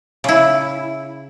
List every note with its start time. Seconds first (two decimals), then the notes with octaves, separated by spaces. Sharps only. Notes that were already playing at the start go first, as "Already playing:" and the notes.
0.24 C#3 E4